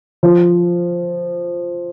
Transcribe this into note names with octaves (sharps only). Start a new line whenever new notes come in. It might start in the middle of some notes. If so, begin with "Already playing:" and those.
F3